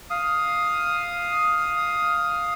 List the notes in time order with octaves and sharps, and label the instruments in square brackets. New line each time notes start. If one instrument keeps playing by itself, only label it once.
[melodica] F5 D#6